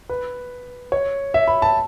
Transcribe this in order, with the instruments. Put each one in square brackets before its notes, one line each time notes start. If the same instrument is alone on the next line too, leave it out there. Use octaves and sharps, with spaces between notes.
[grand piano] B4
C#5
E5
B5
A5